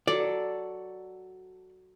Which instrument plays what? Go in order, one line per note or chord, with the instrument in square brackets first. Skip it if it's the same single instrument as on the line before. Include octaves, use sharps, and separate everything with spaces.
[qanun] F#3 A4 [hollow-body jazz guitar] D5